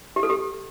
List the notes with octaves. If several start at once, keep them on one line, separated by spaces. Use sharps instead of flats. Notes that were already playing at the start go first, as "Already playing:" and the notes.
G4
A4
G4